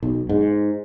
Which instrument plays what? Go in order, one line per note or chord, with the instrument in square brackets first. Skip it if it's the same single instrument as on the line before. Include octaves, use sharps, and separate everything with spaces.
[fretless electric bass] B1
G#2